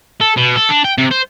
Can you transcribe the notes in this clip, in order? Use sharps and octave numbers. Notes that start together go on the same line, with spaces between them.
A4
B2
A4
D4
G5
C3
C5